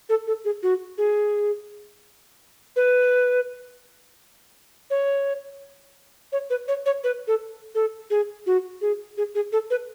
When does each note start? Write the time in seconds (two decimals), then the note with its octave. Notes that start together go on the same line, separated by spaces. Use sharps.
0.09 A4
0.27 A4
0.45 G#4
0.63 F#4
0.98 G#4
2.76 B4
4.90 C#5
6.32 C#5
6.50 B4
6.68 C#5
6.86 C#5
7.04 B4
7.27 A4
7.75 A4
8.10 G#4
8.46 F#4
8.81 G#4
9.17 G#4
9.35 G#4
9.52 A4
9.70 B4